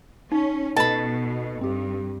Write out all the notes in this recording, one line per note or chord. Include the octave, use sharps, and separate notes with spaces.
C#4 D#4
B2 A4 B4 D#5 A5 B5
G2 C4 G4